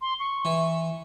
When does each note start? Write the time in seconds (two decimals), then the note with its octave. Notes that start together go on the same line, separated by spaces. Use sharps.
0.01 C6
0.20 C#6
0.45 E3